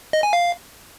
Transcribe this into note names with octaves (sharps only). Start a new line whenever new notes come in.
D#5
G#5
F5